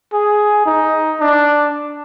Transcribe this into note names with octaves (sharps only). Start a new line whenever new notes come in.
G#4
D#4
D4